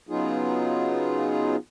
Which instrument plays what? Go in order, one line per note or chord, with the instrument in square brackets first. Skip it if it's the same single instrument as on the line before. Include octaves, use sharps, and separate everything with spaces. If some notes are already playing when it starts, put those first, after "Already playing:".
[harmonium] C#3 F#3 B3 D#4 F4 G#4